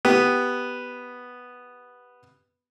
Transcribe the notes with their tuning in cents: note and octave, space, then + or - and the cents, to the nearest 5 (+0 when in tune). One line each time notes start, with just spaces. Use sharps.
B3 +0 G4 +0